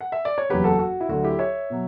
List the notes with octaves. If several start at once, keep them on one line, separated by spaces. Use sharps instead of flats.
F#5
E5
D5
C#5
F#1 E2 C#3 F#3 G4 B4
F#4 A4
F#4
E4
D2 D3 F#3 F#4
E4 G4
C#5 E5
B2 F#3